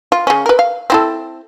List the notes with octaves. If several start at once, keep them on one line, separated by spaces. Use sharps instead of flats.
F4
C#3 C#4
A#4 B4
F5
C4 E4 A4